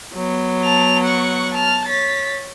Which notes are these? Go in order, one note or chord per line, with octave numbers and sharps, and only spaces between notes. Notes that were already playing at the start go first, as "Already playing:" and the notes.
F#3 B3
A5 F7
F#5 C#6
A5 F6
C#5 A6 B6